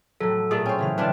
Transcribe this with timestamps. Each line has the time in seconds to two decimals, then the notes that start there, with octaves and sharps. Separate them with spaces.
0.20 A2 F#3 A4
0.51 A#2 A3 G#4
0.66 C#4 C5 G5
0.79 C#3 E3 F6
0.98 E3 G3 D4 F4